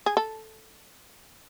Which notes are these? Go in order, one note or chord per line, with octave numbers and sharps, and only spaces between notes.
G#4
A4